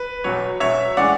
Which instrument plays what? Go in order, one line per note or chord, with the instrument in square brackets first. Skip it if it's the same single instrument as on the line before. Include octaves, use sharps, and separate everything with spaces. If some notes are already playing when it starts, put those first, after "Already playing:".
Already playing: [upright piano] B4
E2 B2 F#3 C#5
E2 B2 F#3 C#5 E5
A2 E3 G#3 D4 D5 F#5